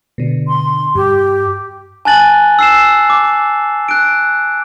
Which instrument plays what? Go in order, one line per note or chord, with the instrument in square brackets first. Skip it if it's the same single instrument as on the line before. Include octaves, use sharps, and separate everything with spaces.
[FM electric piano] B2 D3
[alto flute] C6
[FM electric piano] G2 [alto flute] G4
[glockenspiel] G#5 A5 F#6 A6 F#7
E6 C7 E7
D6
F#6 D7